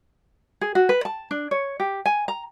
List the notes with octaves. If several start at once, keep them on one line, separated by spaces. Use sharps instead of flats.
G#4
F#4
B4
A5
D4
C#5
G4
G#5
A#5